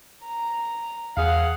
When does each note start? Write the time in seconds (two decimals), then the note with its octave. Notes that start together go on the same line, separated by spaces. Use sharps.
0.24 A#5
1.17 E2 G#4 F5 F#5